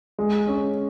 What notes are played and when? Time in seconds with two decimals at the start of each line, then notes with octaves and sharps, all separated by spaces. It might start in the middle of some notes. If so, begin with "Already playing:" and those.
0.19 G#3
0.47 C#4